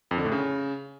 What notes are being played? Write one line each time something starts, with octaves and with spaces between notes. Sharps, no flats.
F2
D3
A2
C#3